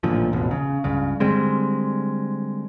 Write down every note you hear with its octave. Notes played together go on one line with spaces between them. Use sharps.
A1 A#2 D3 F3
E1 A1 B2
C#3
C#2 G2 C#3
D3 G3 G#3 C4